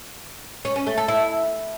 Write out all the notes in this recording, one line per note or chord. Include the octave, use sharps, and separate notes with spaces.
C#4
C#4
A3
A4
E4